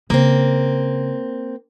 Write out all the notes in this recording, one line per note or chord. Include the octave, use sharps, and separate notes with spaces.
C#3 A#3 C4